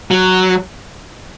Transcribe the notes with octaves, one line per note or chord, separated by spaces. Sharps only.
F#3